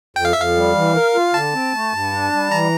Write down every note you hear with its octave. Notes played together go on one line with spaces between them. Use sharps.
F2 G5
F5
F2 E5
F5
G3
E3
A#4
F4
D3 A5
C4
A3
G2
D4
G3
E3 A#5